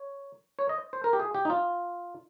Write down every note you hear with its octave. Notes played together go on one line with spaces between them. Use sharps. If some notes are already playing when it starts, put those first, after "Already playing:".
Already playing: C#5
C#5
D#5
C5
A#4
G4
G#4
G4
D#4
F4